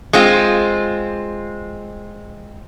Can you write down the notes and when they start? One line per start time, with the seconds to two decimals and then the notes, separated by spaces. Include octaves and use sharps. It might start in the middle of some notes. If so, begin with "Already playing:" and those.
0.13 G#3 C4 F4